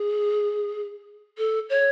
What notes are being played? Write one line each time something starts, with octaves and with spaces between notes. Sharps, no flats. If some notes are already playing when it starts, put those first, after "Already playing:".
Already playing: G#4
A4
C#5